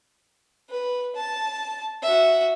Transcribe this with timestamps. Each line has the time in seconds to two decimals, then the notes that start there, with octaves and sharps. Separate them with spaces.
0.70 B4
1.16 A5
2.03 F#4 E5